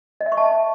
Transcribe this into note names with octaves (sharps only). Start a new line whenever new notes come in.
D#5
E5
C#6
A5